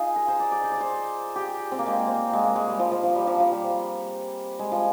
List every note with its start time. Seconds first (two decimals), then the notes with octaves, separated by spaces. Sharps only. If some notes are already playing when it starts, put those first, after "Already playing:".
Already playing: D#4 F4 G#4
0.16 A#4
0.28 C5
0.40 D5
0.52 D5
0.64 C5
0.72 D5
0.80 C5
1.36 G4
1.72 C4
1.79 A#3
1.86 G#3
1.93 A#3
2.08 C4
2.33 G#3
2.44 A#3
2.56 G#3
2.68 G3
2.79 F3
2.92 F3
3.03 F3
3.15 G3
3.27 F3
3.40 F3
3.52 G3
4.59 G#3
4.72 F3